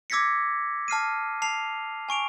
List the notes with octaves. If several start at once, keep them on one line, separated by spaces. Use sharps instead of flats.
D6 E6 G#6 A#6 B6 C#7
A5 F6 C7 D#7
A5 C7 F7
G#5 C#6 D7 F7